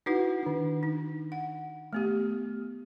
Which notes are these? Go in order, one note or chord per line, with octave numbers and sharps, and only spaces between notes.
D#4 E4 F#4 B4 F#5
D#3 D4
D#4
F#5
A3 B3 G4